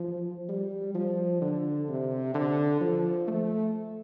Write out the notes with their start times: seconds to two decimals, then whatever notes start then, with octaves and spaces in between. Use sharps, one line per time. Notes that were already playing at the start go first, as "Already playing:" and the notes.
Already playing: F3
0.49 G3
0.95 F3
1.41 D3
1.88 C3
2.34 D3
2.81 F3
3.27 A3